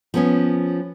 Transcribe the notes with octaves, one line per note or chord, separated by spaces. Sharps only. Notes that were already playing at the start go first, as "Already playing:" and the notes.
F3 B3 C#4